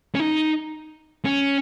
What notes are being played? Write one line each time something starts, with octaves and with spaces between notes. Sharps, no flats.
C#4
D#4
C#4